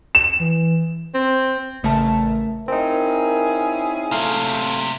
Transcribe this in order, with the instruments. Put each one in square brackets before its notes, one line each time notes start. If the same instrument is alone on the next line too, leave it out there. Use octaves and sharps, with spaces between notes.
[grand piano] E7
[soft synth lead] E3
[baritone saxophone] C4
[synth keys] A1 C#3 A3 A#4 E5 A5
[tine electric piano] C4 D#4 [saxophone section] C#4 E4 G#4 [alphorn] A#4
[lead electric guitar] C3 F#3 [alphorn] A3 [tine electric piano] F5